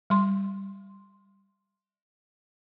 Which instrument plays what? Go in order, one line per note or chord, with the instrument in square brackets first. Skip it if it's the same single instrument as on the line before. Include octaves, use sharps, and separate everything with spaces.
[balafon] G3 C6